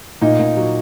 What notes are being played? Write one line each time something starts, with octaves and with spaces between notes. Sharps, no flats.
A#2 D#4
A#2
F#3